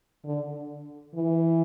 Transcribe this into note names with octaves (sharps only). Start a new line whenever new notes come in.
D3
E3